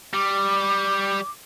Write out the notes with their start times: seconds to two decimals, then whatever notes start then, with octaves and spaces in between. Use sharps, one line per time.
0.13 G3 D6